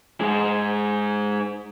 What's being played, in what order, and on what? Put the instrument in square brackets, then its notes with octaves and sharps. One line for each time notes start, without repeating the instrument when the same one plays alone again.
[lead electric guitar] G#2 G#3